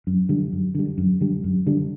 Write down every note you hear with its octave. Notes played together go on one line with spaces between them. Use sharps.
F#2
D3 G3
F#2
D3 G3
F#2
D3 G3
F#2
D3 G3